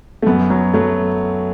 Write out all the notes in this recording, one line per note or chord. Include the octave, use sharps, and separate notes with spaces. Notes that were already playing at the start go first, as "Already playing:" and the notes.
A3
F#2 B3
F#3
F#3 A3